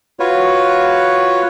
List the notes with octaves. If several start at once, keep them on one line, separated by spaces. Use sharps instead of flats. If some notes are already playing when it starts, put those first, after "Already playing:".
F4 F#4 B4 C#5